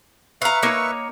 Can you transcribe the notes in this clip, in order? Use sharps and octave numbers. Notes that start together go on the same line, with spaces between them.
B4 E5 F5 A#5 C#6
A#3 D#4 C#5